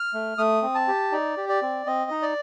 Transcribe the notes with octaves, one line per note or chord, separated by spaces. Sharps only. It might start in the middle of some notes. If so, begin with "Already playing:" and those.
Already playing: F6
A3
A3 D#6
C4
A5
G4
D#4 D5
G4
D5
C4
C4 D#5
D#4
D5